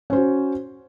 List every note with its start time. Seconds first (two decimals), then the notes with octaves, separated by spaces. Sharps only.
0.10 C#4
0.13 C5
0.16 F#4